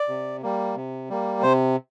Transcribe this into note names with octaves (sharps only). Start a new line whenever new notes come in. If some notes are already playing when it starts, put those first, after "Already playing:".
Already playing: D5
C3
G3 A#3
C3
G3 A#3
C3 C5